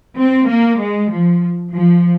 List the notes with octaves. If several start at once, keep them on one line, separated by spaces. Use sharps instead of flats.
C4
A#3
G#3
F3
F3